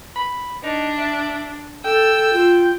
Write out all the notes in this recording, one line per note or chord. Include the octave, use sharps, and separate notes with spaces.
B5
D4 D#4
E5
A4 G5 E6
F4